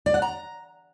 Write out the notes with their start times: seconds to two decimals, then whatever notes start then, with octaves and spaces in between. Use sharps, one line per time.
0.06 D5
0.14 F#5
0.22 A#5